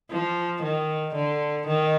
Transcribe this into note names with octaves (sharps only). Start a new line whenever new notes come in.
F3
D#3
D3
D#3